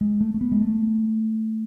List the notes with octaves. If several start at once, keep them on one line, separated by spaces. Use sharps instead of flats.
G#3
A3
A3
B3
G#3
A3